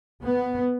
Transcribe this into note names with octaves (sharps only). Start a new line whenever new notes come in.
B3